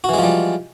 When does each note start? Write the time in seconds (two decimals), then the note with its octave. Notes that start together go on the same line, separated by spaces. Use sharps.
0.04 F#4
0.09 E3
0.14 G#3
0.18 F3
0.23 G3